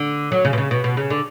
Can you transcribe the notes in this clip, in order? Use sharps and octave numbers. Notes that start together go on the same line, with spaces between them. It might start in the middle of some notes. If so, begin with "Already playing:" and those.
Already playing: D3
F#3
C#3
B2
C#3
B2
B2
C#3
D3